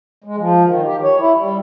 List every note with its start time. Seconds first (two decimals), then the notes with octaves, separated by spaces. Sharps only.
0.24 G#3
0.38 F3
0.66 D#3
0.85 G4
1.03 C#5
1.19 E4
1.36 G3